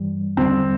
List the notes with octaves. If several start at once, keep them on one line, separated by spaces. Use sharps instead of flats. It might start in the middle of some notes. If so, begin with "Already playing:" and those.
Already playing: G2 E3 G3
E2 D3 G3 C4